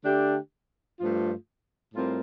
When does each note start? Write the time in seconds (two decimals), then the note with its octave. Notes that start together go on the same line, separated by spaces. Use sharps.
0.04 D3 A3 D4 G4
1.00 G2 F3 A3 D4 F4
1.94 A2 G3 C4 F4 A#4